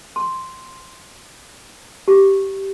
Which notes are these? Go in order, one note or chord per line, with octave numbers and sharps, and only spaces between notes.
C6
G4